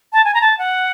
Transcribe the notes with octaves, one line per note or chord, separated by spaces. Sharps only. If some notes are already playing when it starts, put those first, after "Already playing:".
A5
G#5
A#5
A5
F#5